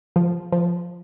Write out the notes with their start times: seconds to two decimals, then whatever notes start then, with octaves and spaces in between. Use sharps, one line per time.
0.16 F3
0.52 F3